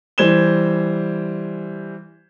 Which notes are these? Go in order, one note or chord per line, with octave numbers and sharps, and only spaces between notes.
E3 G3 C5 G#6 E7 G7